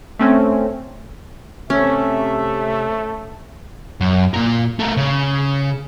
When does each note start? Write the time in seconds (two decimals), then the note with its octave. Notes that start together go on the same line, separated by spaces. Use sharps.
0.19 A3 C4 C#4
1.70 C3 A3 C#4 E5
4.01 F#2
4.34 A#2 A#4
4.79 A3 A#4
4.97 C#3